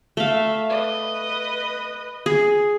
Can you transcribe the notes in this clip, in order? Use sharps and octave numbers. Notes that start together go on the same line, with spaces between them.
A3 E5 F5
B4 D#5
G#4